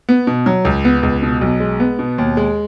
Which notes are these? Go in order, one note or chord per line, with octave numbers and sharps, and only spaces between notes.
B3
B2
F#3
C#2
B3
C#2
B2
B1
G#3
B3
B2
D#2
G#3